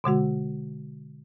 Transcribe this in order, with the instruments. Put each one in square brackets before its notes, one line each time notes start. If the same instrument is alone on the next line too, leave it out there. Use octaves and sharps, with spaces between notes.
[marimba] B2 D3 G#3 F#4